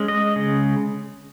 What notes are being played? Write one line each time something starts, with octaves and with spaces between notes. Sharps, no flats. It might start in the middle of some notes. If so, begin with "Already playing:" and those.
Already playing: G#3 C#4
D#5
C#3